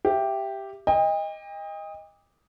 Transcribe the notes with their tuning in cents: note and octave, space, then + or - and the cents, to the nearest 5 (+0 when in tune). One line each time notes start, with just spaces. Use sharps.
G4 +0 E5 +15
D#5 +10 G5 +40